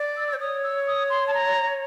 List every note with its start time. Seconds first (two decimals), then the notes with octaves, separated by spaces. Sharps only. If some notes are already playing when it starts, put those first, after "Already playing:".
Already playing: D5
0.17 E6
0.28 E6
0.34 C5
0.39 C#5 D#6
0.64 E6
0.87 D#6
1.10 C6
1.28 A5
1.34 A#5